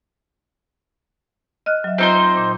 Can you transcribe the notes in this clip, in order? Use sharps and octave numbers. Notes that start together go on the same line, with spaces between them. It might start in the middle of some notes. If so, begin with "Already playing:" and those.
D#5 F6 F#6
F#3 E5
C4 D#4 F4 C5
A#2